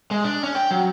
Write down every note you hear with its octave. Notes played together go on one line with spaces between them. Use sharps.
G#3
D4
C#4
G5
F#3